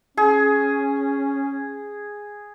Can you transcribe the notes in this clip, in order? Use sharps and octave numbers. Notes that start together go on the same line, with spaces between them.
C#4 G#4